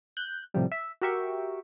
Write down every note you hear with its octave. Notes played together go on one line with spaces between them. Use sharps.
F#6 G6
A2 C3 F3 G3
E5
F#4 G4 A#4 E5 G5 C#6